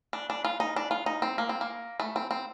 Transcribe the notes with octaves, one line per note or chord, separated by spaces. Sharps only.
D4
D4
F4
D#4
D4
F4
D#4
C4
A#3
C4
A#3
A3
C4
C4